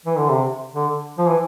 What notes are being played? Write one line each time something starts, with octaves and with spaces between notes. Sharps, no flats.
E3
D3
C3
D3
F3
E3